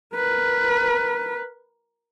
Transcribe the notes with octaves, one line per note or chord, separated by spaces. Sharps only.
A#4 B4